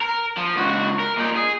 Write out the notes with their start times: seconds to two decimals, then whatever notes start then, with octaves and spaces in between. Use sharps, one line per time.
0.01 A#4
0.37 F3
0.56 C#2 F#4
1.00 A#4
1.18 A#2 D#4
1.36 G#4